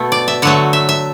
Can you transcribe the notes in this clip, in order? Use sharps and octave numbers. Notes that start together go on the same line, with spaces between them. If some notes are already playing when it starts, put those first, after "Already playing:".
Already playing: B2 A3
D5
E5
D3 F#3 A3 F#5
E5
E5